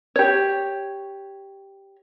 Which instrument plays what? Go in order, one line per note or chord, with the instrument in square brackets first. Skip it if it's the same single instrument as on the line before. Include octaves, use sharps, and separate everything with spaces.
[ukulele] G4 C#5